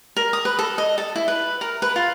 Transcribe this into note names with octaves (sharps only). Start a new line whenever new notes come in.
A#4
D#6
B4
A4
D#5
A4
E4
B4
A#4
B4
F4